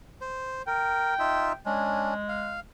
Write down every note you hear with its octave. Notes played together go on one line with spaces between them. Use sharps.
C5
A#4 G5
D#4 F4 E5
G#3 C#4 D4
F5